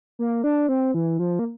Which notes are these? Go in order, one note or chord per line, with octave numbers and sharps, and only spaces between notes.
A#3
D4
C4
E3
F3
A#3